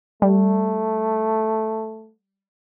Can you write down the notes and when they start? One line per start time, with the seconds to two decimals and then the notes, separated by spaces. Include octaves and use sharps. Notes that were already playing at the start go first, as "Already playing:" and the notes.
0.22 G3 A3